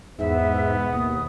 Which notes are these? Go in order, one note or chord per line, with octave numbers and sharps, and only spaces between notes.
E2 G#2 B3 E5
B2
D#2 D#6